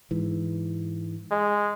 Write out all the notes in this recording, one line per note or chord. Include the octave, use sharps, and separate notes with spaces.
G#2 E3
G#3